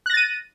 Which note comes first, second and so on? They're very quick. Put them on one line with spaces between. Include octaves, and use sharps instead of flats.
F#6 A#6 A6 D#7